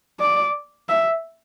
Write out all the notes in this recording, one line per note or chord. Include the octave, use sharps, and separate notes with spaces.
D5
E5